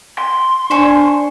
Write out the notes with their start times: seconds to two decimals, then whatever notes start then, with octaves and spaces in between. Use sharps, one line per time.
0.18 C6
0.71 D4 C5 G#5 C#6